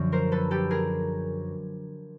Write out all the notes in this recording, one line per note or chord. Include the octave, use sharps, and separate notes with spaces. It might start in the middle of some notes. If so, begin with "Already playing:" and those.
Already playing: F#2 D3 F3
A#4 C5
A4 B4
G4 A4
G#4 A#4